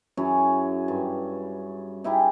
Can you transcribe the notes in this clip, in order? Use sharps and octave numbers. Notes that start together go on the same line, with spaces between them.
F#2 C#4 E4 G#4
G2
D#4 E4 G4 G#4